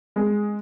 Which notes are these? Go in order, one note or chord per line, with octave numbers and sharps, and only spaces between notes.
G#3